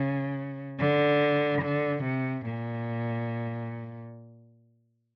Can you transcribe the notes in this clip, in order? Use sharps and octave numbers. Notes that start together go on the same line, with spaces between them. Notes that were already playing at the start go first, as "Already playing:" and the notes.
Already playing: C#3
D3
D3
C3
A#2